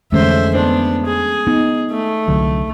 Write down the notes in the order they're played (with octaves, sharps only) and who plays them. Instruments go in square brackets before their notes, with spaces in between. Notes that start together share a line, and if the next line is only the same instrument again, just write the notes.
[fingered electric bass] F2 D3 E3 [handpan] G#3 A3 C#4 [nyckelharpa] C5 E5
[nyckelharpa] B3 D4 [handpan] C5
[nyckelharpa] G#4
[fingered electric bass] B3 [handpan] D#4
[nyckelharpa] A3
[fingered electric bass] C2 D3 F#3